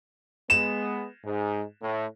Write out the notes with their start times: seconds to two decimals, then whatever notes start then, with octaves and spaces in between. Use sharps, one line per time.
0.50 G#3 B3 E7
1.24 G#2
1.82 A2